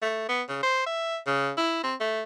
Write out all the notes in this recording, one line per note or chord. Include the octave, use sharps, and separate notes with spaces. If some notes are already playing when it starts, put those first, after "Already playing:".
A3
B3
C#3
C5
E5
C#3
E4
C4
A3